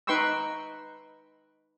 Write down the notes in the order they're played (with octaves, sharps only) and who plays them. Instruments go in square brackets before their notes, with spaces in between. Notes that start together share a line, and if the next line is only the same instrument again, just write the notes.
[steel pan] D#4 B4 G5 C6 C#6 E6